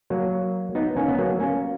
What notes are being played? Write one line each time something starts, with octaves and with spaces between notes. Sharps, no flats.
F#3 A#3
B3 D#4
A#3 C#4
B3
F#3 A#3
A#3 C#4